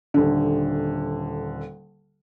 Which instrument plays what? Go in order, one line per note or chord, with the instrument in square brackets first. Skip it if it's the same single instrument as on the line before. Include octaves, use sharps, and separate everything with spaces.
[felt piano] D#1 D3